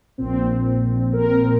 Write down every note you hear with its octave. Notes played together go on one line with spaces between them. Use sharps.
A#1 A#2 C4
A#4